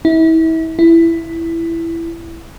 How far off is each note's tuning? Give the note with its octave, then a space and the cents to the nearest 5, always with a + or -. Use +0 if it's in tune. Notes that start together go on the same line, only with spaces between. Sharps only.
E4 -35
E4 +10